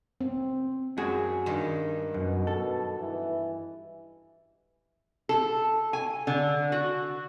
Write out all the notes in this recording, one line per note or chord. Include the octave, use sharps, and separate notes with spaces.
C4
F#2 G#3 F#4 G#4
G2 D#3
F#2 B2
A4
E3
A4
G#5
D3
F#4